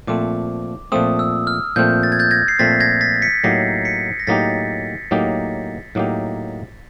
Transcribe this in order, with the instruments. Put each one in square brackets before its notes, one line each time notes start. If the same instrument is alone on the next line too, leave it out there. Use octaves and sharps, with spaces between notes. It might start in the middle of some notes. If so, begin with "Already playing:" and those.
[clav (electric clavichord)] A#2 F3 A3 C4 [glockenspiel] D6
[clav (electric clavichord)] A#2 F3 A3 C4 [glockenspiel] D#6
[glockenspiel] E6
F6
[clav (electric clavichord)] A#2 F3 A3 C4 [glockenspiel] G6
[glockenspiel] A6
G#6
G6 A6
G#6 A#6
C7
[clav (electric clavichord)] A#2 F3 A3 C4 [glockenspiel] A6 B6
[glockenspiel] G#6 A#6
A6 B6
B6 C#7
[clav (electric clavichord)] A2 F#3 A#3 D#4 G4 [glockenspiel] A#6 C7
[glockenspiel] B6 C#7
A#6
[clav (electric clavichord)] A2 F#3 A#3 D#4 G4 [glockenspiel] A6 B6
[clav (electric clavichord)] A2 F#3 A#3 D#4 G4
A2 F#3 A#3 D#4 G4